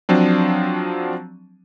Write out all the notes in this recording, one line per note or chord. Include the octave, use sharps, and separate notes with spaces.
F3 F#3 C4 D4